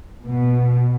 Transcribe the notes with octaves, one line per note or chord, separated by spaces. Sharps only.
B2